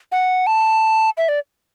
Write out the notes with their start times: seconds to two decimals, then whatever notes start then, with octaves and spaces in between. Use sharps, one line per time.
0.12 F#5
0.47 A5
1.18 E5
1.29 D5